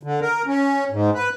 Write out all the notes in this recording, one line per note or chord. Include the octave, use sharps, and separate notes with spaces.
D3
A#4
C#4
G#2
B4